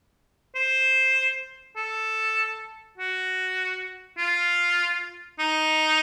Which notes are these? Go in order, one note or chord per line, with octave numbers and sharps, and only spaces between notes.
C5
A4
F#4
F4
D#4